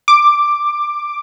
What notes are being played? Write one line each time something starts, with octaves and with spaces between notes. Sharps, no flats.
D6